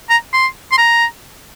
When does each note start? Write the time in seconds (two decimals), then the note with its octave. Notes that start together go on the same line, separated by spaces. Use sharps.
0.10 A#5
0.33 C6
0.72 C6
0.78 A#5